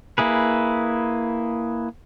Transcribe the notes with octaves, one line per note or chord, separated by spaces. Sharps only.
A#3 E4 G#4 B4